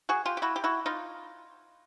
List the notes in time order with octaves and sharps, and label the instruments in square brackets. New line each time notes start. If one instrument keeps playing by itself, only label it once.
[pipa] F#4 G#4
F4 G4
G4
E4 F#4
G4
E4 F#4
D#4 F4